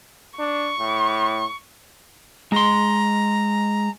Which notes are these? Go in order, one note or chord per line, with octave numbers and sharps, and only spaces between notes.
D4 C#6
A2
G#3 A#5 C6